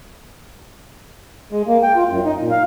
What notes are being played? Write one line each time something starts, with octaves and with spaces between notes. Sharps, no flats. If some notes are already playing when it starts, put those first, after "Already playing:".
G#3
A#3
G5
F4
F#2
D#4
A#2
F5